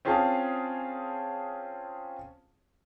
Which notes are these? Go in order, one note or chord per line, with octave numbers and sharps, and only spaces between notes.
C4 C#4 F4 G#4 F5 A5